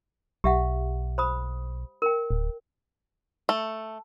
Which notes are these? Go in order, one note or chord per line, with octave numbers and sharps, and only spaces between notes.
B1 G4 E5 F#5
C5 B5 D#6
A#4 G5
D1
A3